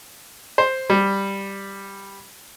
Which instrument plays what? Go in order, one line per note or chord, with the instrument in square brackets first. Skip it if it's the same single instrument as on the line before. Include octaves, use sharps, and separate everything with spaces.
[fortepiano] C5
G3